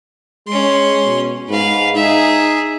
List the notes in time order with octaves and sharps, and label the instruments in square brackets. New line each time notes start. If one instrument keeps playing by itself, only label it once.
[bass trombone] G#3 [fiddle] C#4 C6
[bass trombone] B2
[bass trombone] G#2 [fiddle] B4 F5
[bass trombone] D#4 [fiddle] G#4 E5